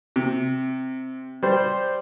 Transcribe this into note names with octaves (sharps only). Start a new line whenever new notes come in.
C3
G3 C5